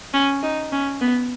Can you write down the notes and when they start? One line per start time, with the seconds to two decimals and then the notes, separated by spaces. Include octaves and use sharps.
0.13 C#4
0.43 D#4
0.72 C#4
1.01 B3